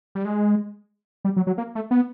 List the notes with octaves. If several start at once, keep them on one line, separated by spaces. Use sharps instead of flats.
G3
G#3
G3
F#3
F#3
A#3
A3
B3